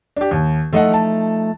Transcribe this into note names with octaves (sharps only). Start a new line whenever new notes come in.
D4 G4
D#2
F3 A3 D#4 A4 D#5 F#5
A5